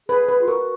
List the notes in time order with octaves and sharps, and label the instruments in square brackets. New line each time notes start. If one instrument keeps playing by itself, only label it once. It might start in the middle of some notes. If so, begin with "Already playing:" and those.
[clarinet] G#4 [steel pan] B4
[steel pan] B4
[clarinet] F4
[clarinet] F#4 [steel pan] A#4